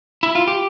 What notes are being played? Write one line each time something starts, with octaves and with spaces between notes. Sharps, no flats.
E4
F4
G4